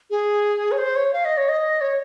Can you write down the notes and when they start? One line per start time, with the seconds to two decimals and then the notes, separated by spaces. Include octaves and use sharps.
0.10 G#4
0.71 C#5
0.78 C5
0.96 C#5
1.13 F5
1.25 D#5
1.37 C#5
1.49 D#5
1.81 C#5